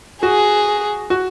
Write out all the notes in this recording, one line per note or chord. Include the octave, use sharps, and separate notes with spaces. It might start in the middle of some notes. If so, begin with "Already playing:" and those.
F#4 G#4
F#4